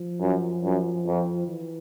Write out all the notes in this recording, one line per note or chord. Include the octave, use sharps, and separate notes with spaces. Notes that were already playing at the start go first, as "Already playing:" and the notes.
Already playing: F3
F#2
F#2
F2
E3